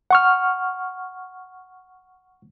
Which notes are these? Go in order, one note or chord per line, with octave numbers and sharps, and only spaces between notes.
F#5 C#6 F6